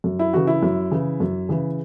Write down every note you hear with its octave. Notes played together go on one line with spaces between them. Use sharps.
F#2
E4
C#3 E3 F#4
E4
F#2
C#3 E3
F#2
C#3 E3